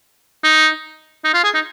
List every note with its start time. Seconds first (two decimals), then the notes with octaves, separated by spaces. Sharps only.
0.44 D#4
1.24 D#4
1.34 F4
1.44 G#4
1.54 D#4